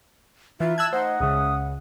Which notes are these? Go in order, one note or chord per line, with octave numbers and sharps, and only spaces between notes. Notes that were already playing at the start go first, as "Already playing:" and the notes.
E3 D#4 F4 E5
A5 E6 F#6 G#6
A3 D#4 C5 D#5 F#5
C#2 C#3 E5 D#6